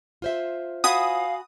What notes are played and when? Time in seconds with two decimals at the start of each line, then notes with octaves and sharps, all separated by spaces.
0.22 F4 C5 E5
0.84 F#4 F5 G#5 B5 D#6